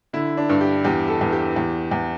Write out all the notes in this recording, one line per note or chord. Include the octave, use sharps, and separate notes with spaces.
D3 E4
D4
G2
G4
E2 G4
A4
E2
G4
E2
E2